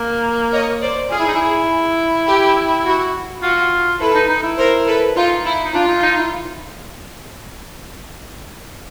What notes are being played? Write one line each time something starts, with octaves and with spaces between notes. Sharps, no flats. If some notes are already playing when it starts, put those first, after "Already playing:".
Already playing: A#3
C#5 D#5
C5 D5
F4 G#4
E4
D#4
E4
G4
F#4
F4 F#4
E4 A4 B4
D#4
D#4
E4
A#4 C5
A4 B4
D#4 F4
E4
D#4
D4 F4
D#4
D#4
E4